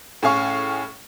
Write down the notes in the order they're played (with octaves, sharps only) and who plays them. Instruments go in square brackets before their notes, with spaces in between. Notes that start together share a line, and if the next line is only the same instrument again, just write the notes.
[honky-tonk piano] A2 C#4 G#4 F5 C#6